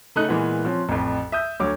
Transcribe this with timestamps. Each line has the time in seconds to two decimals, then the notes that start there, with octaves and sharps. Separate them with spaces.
0.16 C#3 A3 D#4 D#6 F#6
0.28 A#2 E3 G#3 B3
0.65 F3 C4 C#4
0.89 A1 F2
1.32 E5 D#6 G6
1.60 D2 F#3 C#5 D6